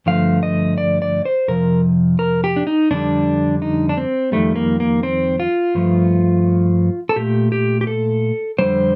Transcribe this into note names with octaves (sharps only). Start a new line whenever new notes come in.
G2 D3 F3 A3 F5
D#5
D5
D5
C5
F2 C3 F3 A#4
A#4
G4
D4
D#4
F2 D3 G3 D4
D#4
D4
C4
F2 D#3 G3 A3
A#3
A#3
C4
F4
G2 F3 A3
A4
A#2 A3 G4
G4
G4
A4
F2 D3 G3 C5